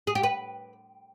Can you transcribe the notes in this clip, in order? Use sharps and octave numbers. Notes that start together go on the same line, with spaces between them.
G#4
G4
B4